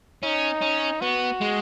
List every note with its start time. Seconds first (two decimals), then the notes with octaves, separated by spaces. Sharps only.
0.23 C#4 D#4
0.62 C#4
1.01 B3 F#4
1.41 G#3